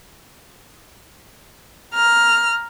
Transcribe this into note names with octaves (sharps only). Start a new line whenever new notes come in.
A#5 F6